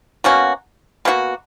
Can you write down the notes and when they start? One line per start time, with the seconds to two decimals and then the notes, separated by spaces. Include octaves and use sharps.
0.24 B2 A#3 C#4 F#4
1.05 B2 A#3 C#4 F#4